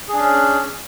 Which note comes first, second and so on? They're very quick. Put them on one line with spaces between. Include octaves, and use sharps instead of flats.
G#4 D4 C#4